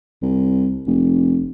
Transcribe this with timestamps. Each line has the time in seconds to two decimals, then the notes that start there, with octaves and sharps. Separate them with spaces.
0.22 C2
0.87 F1